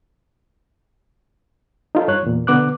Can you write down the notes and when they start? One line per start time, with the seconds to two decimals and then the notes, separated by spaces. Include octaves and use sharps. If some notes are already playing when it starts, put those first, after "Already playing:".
1.95 D#4 F4 A4
2.08 G2 C#5 F#6
2.23 E2 A#2
2.47 B2 D3 B3 D6 F#6